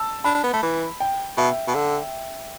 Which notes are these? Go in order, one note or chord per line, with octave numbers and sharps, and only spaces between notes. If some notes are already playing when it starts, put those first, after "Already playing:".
Already playing: A5 E6
D4 B5
D4
B3
A3
E3
G5
B2 E5
B2
D3